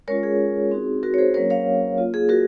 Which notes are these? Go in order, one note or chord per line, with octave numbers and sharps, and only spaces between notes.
G#3 C#4 F4 A#4 C#5
G#4
C4 D#4 F#4
F#4 A#4
C#5
G#4 C5
F#3 A#3 C#4 A#4 C#5
C#5 F5
A#3 F4
G#4
F#4 A#4